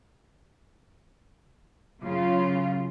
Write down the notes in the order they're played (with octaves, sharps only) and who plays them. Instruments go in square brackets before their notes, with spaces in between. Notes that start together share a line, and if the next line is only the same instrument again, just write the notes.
[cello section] F#2 C#3 F4